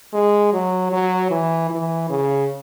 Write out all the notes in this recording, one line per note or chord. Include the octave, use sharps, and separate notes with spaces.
G#3
F#3
F#3
E3
E3
C#3